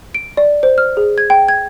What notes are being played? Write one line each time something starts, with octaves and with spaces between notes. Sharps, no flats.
D7
D5
C5
F6
G#4
G#6
G5
G#6